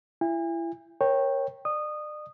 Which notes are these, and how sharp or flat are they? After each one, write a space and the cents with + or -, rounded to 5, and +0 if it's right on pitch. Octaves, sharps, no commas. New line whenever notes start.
E4 +30 G#5 -40
A#4 +20 C#5 -15 G5 +0
D5 +40 D#6 -15